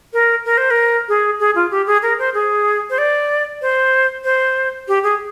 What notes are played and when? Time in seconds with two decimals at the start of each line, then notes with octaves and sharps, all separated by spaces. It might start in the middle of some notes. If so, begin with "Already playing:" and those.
0.13 A#4
0.45 A#4
0.58 C5
0.71 A#4
1.09 G#4
1.40 G#4
1.55 F4
1.71 G4
1.87 G#4
2.02 A#4
2.19 C5
2.34 G#4
2.90 C5
2.98 D5
3.62 C5
4.24 C5
4.88 G4
5.03 G#4